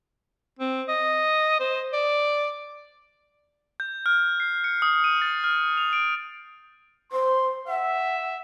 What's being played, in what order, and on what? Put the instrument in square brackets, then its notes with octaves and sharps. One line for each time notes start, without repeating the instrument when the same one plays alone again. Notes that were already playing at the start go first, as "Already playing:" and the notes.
[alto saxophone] C4
D#5
C5
D5
[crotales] G6
F6
C7
C#7
D#6
D#7
A6
F6
F7
D7
[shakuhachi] C5 [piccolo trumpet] C6
[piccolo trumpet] E5 [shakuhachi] F#5